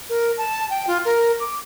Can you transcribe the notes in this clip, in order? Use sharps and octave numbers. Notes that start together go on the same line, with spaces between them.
A#4
A5
G5
F4
A#4
D6